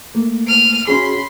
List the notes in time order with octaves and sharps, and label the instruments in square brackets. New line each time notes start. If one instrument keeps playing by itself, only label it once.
[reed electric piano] A3 A#3
[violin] F6 D#7
[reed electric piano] C#4 F#4 G#4 [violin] B5 C6